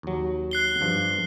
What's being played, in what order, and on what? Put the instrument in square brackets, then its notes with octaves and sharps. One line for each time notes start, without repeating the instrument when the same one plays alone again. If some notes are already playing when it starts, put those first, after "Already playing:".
[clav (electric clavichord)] D#2 F#3
[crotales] F#6 C7 G7
[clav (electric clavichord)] G2 F3